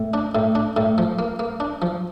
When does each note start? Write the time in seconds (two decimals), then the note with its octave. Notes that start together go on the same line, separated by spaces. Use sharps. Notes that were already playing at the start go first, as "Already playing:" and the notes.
Already playing: A2
0.14 D4
0.35 A2
0.55 D4
0.77 A2
0.98 F3
1.19 A#3
1.39 A#3
1.60 D4
1.82 F3